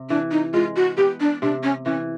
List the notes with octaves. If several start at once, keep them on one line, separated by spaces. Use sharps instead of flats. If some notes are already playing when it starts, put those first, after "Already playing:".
Already playing: C3
E3 D4
D#4
G#3 F4
F#4
B3 G4
D4
C3 D4
C#4
E3 C#4